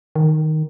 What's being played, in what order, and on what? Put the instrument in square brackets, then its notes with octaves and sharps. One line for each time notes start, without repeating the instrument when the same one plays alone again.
[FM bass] D#3